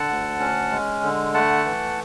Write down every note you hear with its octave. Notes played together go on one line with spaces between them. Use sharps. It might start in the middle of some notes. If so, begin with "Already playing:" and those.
Already playing: D3 F#5 A5
D2
C#4
G#3
D3
A3 F#5 A5
E3